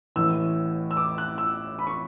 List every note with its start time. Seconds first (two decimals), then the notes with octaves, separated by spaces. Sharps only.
0.16 A1 A2 E3 E6
0.91 E6
0.97 D6
1.18 F#6
1.38 E6
1.79 B5
1.87 C#6